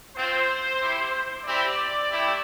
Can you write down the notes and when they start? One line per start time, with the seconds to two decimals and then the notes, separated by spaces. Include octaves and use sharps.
0.16 C4 F4 C5
0.81 C4 E4 G4
1.44 C4 E4 G4 D5
2.08 A3 E4 G4